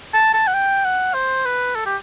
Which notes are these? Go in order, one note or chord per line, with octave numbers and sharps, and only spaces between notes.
A5
A5
F#5
G5
F#5
C5
B4
A4
G4